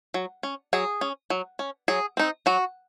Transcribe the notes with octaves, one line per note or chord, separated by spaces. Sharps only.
F#3
C#4
F#3 G#4
C#4
F#3
C#4
F#3 G#4
C4 D#4
F#3 F#4